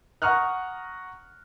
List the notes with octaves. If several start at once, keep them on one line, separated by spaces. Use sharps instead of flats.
F#5 A#5 C#6 D#6 F6 F#6